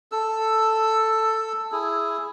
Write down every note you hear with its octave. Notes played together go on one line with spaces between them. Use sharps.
A4 E6
E4 G#4